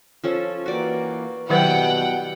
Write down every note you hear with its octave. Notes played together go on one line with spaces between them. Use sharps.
F3 C#4 A4
E3 A#3 F#4 D5 G5
B2 D#3 F#3 G3 E4 B4 F#5 G5